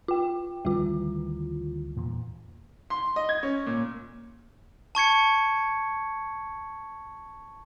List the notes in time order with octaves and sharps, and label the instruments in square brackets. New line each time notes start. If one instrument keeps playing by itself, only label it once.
[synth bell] F4 G5
[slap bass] D2 D#3 E3 [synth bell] G3 F4
[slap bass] E2 A#2
[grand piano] C6
D#5
G#6
C#4
A#2
[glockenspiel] A5 C#6 G#6 C#7